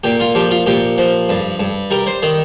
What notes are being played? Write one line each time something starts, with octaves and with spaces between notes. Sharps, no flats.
A#2 G4
F4
F3 G4
F4
A#2 G4
F3
G2
G2
G3 A#4
C5
D#3 D#5